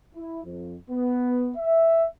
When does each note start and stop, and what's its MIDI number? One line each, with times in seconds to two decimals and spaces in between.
0.16 0.40 64
0.45 0.76 41
0.90 1.51 59
1.57 2.05 76